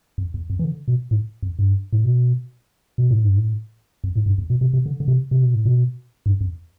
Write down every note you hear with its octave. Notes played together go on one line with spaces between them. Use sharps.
F2
E2
F2
E3
D3
B2
A2
F2
G2
A2
B2
B2
A2
G2
A2
F2
A2
G2
E2
B2
C3
C3
D3
D3
C3
C3
B2
A2
B2
G2
F2